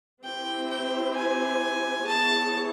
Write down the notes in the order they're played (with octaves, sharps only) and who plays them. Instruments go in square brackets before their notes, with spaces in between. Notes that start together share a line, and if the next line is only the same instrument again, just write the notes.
[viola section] C4 E4 G4 C5 [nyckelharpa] G5
[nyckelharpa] G5
G#5
[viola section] B3 E4 G#4 C#5 [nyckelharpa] A5